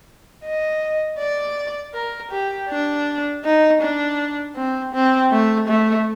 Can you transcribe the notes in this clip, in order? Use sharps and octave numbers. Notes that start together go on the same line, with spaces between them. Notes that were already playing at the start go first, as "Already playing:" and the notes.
D#5
D5
A#4
G4
D4
D#4
D4
C4
C4
A3
A3